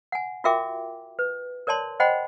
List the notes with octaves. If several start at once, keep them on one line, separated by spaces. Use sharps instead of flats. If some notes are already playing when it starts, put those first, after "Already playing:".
F#5 G#5
F4 F#4 A#4 E5 G5 D6
B4
A#4 C#5 D5 A5 C6
C5 D#5 F#5 G5 B5 C6